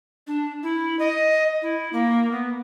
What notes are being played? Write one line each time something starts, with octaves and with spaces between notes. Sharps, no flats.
D4
E4
D#5
E4
A#3
B3